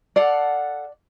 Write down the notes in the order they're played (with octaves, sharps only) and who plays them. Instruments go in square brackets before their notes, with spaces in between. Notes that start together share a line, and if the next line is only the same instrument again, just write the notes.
[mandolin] A4 F5 F#5 [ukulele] D5